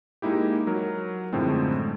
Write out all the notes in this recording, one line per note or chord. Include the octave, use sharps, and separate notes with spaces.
G#3 A#3 D#4 E4 G4
F#3 A#4
F#2 A2 D3 F3 G#3 C4